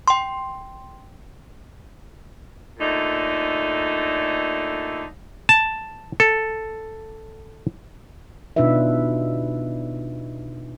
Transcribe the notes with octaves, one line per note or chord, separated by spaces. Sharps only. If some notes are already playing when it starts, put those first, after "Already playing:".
G5 C6
A#2 D3 A3 D#4
A5
A4
B2 D4 D#4 F4 B4 E5